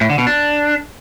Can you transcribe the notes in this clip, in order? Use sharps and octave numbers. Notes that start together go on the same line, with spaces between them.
A2
D3
B2
D4